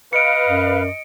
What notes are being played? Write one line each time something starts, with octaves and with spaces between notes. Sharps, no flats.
B4 D#5 F5 C#7 D7
F#2